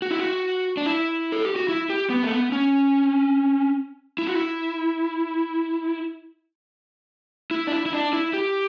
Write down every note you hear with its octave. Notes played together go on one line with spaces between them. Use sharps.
F#4
E4
F#4
D4
E4
A4
G4
F#4
E4
G4
B3
A3
B3
C#4
E4
F#4
E4
E4
D4
E4
E4
D4
E4
G4